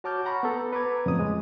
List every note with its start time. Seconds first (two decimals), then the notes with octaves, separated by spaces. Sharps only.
0.04 F#4 C#5 A5 D6 F6 G6
0.25 F#5 A#5 B5 C#6
0.43 B3 A4
0.73 B4 A#5 D6 G#6
1.06 F2 A2 C#3 D#6
1.19 G#3